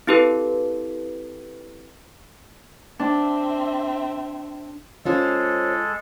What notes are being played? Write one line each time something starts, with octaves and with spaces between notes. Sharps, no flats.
C4 E4 G4 A4 B4
C4 D4 E5
G#3 C#4 F4 A4 C5